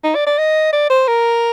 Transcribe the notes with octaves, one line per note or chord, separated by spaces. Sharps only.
D#4
D5
D5
D#5
D5
C5
A#4